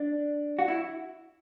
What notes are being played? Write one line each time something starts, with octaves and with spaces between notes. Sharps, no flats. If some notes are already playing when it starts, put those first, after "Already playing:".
Already playing: D4
F#4
E4